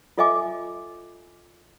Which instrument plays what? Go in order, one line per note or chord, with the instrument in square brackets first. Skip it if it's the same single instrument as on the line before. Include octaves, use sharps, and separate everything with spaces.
[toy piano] F4 A4 D#5 E5 G#5 D6